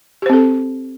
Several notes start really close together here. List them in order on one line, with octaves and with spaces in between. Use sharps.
G4 C5 C4 A4